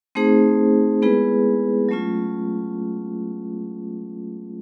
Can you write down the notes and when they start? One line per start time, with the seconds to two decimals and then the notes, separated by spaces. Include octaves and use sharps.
0.15 A3 C4 D#4 G#4 C5
1.02 G#3 B3 E4 G#4 B4
1.89 F#3 A3 C#4 F4